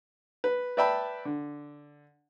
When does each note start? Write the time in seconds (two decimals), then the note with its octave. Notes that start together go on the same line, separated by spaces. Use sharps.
0.44 B4
0.77 B4 D5 E5 G5 A5 B5
1.25 D3